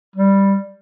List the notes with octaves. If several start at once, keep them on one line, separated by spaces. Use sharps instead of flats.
G3